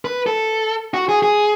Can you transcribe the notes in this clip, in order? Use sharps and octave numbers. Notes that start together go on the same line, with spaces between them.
B4
A4
F#4
G#4
G#4